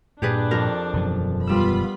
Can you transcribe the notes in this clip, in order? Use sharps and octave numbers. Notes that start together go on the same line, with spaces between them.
G2 A#2 D4 G4 G#4 B4
F2 A#4
E1 F#2 F3
G3 B3 F4 B5 E6